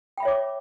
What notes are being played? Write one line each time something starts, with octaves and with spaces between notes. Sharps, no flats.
C#5 E5 G5 B5 D6